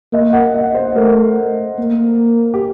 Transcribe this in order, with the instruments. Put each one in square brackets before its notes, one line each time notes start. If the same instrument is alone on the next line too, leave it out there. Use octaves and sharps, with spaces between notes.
[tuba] A#3 [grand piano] D#5
[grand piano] F#5
D#5
C5
[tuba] A3 [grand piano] A#4
[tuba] A#3
[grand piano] G4